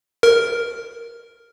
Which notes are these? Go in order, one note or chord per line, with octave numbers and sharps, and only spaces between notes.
A#4